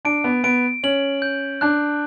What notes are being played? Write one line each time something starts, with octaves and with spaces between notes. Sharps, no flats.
D4 D7
B3
B3 D7
C#4 F#7
G6
D4 F#6